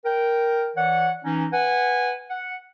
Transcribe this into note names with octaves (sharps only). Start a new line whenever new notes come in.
A#4 G5
E3 C#5 D5 F#5
E3 C#4 D#4
B4 F#5 G#5
F#5